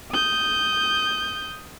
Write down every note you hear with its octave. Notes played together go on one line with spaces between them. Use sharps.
D#6 G6